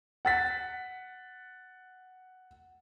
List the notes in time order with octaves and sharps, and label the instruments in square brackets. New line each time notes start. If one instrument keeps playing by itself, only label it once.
[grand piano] F#5 A6 B6